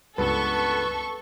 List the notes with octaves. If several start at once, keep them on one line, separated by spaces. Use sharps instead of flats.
C#2 G2 B3 A4 B4 C#6